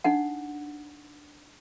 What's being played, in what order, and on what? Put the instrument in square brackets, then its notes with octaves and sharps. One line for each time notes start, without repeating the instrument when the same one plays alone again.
[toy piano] D4 D#4 F#5